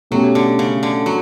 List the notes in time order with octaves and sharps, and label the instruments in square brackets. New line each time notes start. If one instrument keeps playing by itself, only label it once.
[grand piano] B2 A3 C#4 G4 [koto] F#3
[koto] D3
C#3
D3
[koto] F#3 [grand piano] F#4